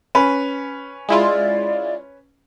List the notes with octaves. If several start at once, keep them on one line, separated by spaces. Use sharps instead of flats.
C#4 B4
G#3 E4 F4 D5